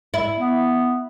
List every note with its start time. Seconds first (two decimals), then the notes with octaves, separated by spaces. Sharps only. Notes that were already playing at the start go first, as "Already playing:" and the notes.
0.14 E4
0.38 B3